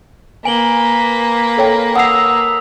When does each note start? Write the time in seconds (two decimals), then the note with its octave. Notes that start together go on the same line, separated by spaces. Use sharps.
0.45 A#3 B4 G#5 F#7 G7
1.57 A4 C#5 G5
1.96 F#5 A5 D#6 E6 C7 F7